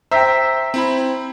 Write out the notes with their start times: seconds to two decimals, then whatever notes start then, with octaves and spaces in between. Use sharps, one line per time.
0.11 C5 E5 G5 A#5 E6 B6
0.74 C4 E4 B5